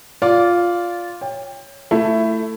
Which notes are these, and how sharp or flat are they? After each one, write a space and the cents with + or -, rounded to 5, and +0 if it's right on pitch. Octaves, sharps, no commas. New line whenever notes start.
F4 +0 D5 -20
C#5 +0 G5 +30
A3 +15 E4 +10